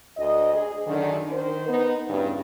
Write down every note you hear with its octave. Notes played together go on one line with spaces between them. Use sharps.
D2 D#5
G#4
F#2 D3 D#3
D#3 A#4 C5
B3 D#4
E2 G2 C#3